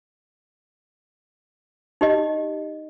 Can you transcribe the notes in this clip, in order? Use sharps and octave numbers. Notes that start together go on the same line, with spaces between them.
D#4 G4 D#5